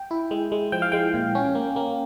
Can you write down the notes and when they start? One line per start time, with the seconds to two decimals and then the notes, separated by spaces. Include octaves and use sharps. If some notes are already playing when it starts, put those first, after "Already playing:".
Already playing: G5
0.11 E4
0.31 G#3
0.52 G#3
0.72 F3 G5
0.82 F5
0.92 G#3 G5
1.14 A#2
1.35 C#4
1.55 A#3
1.76 A#3